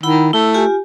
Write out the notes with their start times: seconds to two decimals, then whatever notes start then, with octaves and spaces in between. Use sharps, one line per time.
0.03 D#3 E4 F#5 B5
0.33 A3 E4
0.54 F4 G4 G#5